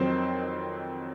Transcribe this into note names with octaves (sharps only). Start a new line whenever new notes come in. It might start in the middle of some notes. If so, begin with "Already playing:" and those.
Already playing: F2 D#3 F#3 C4 C5